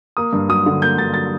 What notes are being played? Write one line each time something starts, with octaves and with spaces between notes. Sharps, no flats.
A#3 D#6
G2
F#3 D#6
D3
A#3 G6
G2 A6
F#3 A6